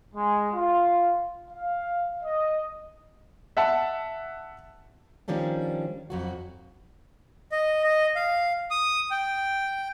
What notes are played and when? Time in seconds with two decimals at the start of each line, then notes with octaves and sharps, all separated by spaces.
0.15 G#3
0.53 F4
1.50 F5
2.23 D#5
3.57 E5 F#5 A5
5.28 D#3 F3 G3 C#4 D4
6.10 F2 F#3 F#4
7.52 D#5
7.84 D#5
8.16 F5
8.71 D#6
9.11 G5